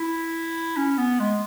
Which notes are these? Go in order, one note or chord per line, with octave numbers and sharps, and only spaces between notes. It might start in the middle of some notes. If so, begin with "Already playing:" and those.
Already playing: E4
C#4
B3
G#3